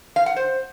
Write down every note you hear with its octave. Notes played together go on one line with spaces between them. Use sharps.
F5
F#5
C5